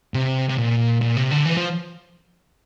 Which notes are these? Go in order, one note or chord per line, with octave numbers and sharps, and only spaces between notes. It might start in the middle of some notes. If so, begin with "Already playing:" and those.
C3
C3
A#2
A#2
C3
D3
E3
F3